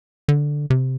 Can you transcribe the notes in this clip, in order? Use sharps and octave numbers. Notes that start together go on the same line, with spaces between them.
D3
C3